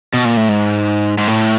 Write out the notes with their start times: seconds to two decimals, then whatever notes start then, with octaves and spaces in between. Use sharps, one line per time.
0.13 B2
0.25 A#2
0.37 A2
0.49 G#2
1.18 G#2
1.28 A2